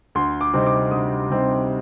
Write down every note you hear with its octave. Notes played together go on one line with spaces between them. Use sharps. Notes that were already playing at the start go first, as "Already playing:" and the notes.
D2 C6
D6
C3 G3 C4 D#4
D6
D2 D#6
C3 G3 C4 D#4